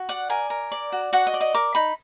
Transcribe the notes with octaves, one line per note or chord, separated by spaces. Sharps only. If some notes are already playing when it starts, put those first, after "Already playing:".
Already playing: F#4
D5 F#5
A#4 G#5
A#4
D5
F#4
F#4 F#5
D#5
D5
D#5
A#4 D6
D#4 B5